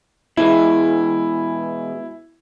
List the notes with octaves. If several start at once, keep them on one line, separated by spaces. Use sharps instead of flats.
B2 E3 G#3 E4